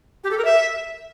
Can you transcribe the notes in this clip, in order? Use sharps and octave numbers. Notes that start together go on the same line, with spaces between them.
G4
A4
A#4
E5